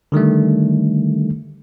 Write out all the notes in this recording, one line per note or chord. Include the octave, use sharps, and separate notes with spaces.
D3 D#3 G3 A3